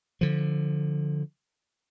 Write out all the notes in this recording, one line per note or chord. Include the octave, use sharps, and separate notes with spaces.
D3 F3